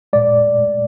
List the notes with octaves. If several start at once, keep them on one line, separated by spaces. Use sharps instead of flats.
A#2 G#3 D5